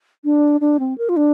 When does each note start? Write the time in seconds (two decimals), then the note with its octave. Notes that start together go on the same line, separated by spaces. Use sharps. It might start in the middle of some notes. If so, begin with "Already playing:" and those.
0.24 D4
0.61 D4
0.79 C4
0.98 A#4
1.09 F4
1.16 D4